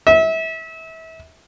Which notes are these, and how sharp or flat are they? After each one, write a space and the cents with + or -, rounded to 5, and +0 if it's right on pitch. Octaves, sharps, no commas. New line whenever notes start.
E5 -30